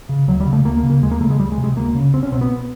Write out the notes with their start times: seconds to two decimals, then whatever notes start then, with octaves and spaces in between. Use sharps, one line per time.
0.09 C#3
0.28 D2 F#3
0.40 G3
0.47 C#3
0.53 A3
0.65 D2 A#3
0.77 A#3
0.84 C#3
0.90 A#3
1.03 D#2 G#3
1.12 A#3
1.21 C#3 A3
1.30 G#3
1.39 C#2 G3
1.52 G#3
1.58 C3
1.64 G#3
1.76 D2 A#3
1.95 C#3
2.13 C2 C4
2.23 C#4
2.32 B2 C4
2.41 B3